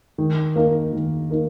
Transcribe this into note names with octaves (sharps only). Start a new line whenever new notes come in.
D#3
A#3 D#4 A#4
D#3
A#3 D#4 A#4